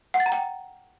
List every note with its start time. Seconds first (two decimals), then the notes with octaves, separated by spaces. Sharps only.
0.14 F#5
0.20 A6
0.26 A#5
0.32 G5